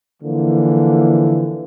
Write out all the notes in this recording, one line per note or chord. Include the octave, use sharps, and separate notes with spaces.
D3 E3 F3 A#3